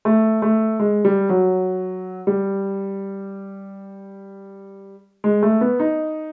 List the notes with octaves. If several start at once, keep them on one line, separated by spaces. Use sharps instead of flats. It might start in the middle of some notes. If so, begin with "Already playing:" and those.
A3
A3
G#3
G3
F#3
G3
G#3
A3
B3
D#4